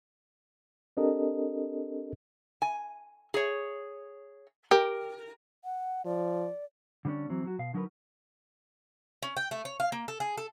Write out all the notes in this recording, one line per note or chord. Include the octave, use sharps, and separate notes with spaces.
C4 D4 G4 A4 A#4 D#5
G#5
G#4 C#5
G4 A#4
F#5
F3 D5
D3 G3 B3 C#4 D4
E3 F#3 C4
F#3 F#4
B2 F5
D3 F#3 D#4 F4 A#4 B4
C#4
G5
A3
C#5
F5
A#3
A4
G#4
A4